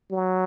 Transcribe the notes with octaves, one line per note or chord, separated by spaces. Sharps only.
F#3